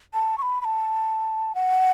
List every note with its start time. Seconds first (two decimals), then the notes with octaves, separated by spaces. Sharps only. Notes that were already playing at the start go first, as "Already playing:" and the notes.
0.14 A5
0.38 C#6
0.42 B5
0.61 B5
0.65 A5
1.55 F#5